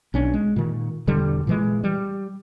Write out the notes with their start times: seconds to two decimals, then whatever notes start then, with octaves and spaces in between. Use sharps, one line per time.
0.14 B1 C#4 D4
0.34 G#3
0.56 A#2 D#3
1.07 E1 D3 G3
1.47 A#2 E3 G#3
1.84 G3